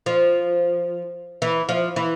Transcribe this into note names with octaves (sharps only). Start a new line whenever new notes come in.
F3
E3
F3
E3